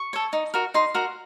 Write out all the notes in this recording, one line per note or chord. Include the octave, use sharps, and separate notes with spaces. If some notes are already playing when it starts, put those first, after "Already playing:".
Already playing: C#6
A4 C#5
D#4
F#4 A#4
D#4 C6
F#4 A#4